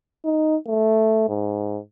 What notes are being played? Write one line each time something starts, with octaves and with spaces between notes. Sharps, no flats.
D#4
A3
G#2